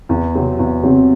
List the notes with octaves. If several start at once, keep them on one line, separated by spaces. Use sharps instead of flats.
E2
C3 F#3 C4
E2
C3 F#3 C4